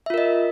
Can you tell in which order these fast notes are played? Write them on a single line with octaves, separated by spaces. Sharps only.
E5 F4 A#4 D#5